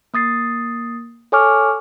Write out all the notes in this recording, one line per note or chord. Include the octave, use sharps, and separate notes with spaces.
A#3 D#6 A6 C7
A4 C#5 G#5 C#6 D6 F6